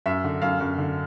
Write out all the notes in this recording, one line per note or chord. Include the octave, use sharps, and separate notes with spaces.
F#2 E5
D3
F#2 F5
F#2
D3